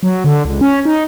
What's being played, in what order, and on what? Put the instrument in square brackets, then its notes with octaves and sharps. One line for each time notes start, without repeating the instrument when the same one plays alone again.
[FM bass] F#3
D3
C#2
C#4
D#4